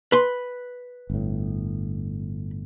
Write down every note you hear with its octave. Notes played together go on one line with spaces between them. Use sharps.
B4 B5 C6
G1 A2